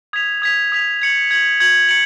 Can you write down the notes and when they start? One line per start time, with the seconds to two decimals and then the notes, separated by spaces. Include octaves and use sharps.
0.13 D#6 G#6 B6 F7
0.42 D#6 G#6 B6 F7
0.72 D#6 G#6 B6 F7
1.02 G#6 C#7 F#7
1.31 G#6 C#7 F#7
1.60 G#6 C#7 F#7
1.89 C#7 F#7